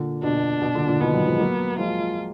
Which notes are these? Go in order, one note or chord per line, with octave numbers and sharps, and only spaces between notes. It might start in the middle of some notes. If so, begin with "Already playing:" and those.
Already playing: A#2 D3
B2 D4
B2
B2
A#2 D3
A#2 D3
B2 D#3 B3
D#3 F#3
F3 G#3
F#3 A#3
F3 G#3 F4